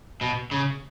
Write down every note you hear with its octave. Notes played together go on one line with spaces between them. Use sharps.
B2
C#3